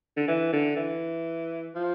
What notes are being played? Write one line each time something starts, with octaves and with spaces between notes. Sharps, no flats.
D3
E3
D3
E3
F3